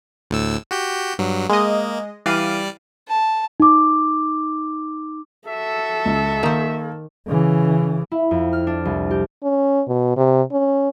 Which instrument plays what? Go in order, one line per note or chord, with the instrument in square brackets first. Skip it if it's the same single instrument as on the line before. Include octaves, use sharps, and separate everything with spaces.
[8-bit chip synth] D2 A2 E6
F#4 G4 G6
G2 F#3
[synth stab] G#3 D#5 [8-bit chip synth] A#3
[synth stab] E3 F5 D#7 [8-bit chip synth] G3 D5
[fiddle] A5
[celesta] D#4 D6
[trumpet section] F#4 E5 [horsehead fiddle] A4
[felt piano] C#2
[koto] D#3 C5 [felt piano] A#3
[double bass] C#3 E3
[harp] E4
F2
F6
D4
C2
G4
[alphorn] C#4
B2
C3
C#4